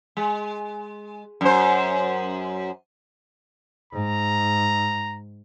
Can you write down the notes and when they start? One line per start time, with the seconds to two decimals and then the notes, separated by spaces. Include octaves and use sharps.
0.17 G#3
1.41 F#2 C5
3.93 G#2 A#5